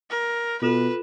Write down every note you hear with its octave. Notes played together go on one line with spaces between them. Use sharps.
A#4
B2 F4 A4 B4 E7